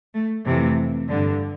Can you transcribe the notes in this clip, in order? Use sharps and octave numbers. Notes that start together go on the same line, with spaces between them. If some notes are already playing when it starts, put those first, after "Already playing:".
A3
F2 C3 E3 A3
G2 D3